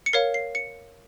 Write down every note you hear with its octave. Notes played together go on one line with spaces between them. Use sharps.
C#7
A#4 C#5 F5 C7
C7
C#7